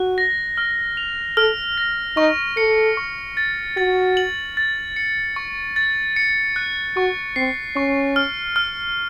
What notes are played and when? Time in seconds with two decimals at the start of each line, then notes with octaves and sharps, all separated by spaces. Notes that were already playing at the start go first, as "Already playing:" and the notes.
Already playing: F#4 F#6
0.18 A#6
0.57 F6
0.97 F7
1.37 A4 F6
1.78 A#6
2.17 D#4 C#6
2.57 A4 C#7
2.97 C#6
3.37 A6
3.77 F#4 A6
4.17 F#7
4.57 A6
4.96 C#7
5.36 C#6
5.76 A6
6.16 C#7
6.56 F#6
6.97 F#4 C#6
7.36 C4 C7
7.76 C#4 C#6
8.16 F6
8.56 F6